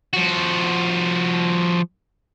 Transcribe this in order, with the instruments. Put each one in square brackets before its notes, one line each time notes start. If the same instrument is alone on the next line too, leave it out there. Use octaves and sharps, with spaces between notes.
[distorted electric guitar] F3 F#4